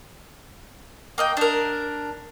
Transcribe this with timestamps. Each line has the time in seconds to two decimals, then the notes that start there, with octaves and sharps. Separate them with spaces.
1.18 A#3 D#5 G5
1.37 D4 A#4